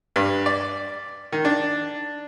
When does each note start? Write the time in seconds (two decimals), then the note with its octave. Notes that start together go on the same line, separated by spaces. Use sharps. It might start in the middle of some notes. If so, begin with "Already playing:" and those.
0.16 G2
0.46 D5
1.33 D#3
1.45 D4